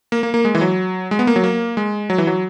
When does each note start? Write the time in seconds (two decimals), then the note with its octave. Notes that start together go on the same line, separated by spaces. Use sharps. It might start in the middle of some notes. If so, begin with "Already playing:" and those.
0.12 A#3
0.23 A#3
0.34 A#3
0.45 G#3
0.55 E3
0.61 F#3
1.11 G#3
1.19 B3
1.27 A#3
1.36 F#3
1.44 A#3
1.77 G#3
2.10 F#3
2.18 E3
2.27 F#3